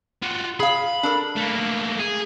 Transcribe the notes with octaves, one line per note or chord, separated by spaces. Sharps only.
F4 F#4
G#4 F5 B5
D4 A4 A#4
A3 A#3
G#4